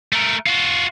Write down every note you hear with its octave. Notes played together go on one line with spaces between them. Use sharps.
A3 A#4
F4 F#4